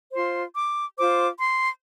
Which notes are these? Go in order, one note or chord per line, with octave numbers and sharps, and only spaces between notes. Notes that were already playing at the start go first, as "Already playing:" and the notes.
F4 C5 C6
D6
F4 C5 D6
C6